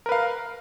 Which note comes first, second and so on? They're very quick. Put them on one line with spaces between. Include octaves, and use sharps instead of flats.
A#4 B4 F5